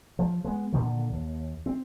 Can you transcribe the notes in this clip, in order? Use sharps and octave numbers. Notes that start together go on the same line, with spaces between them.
F3
G#3 B3
A#2 D3 D#3
D#2
C4